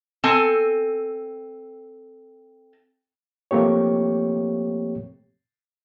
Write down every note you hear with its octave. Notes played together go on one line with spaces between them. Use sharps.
C4 A4 G#5
F3 A3 A#3 C4 G4 C#5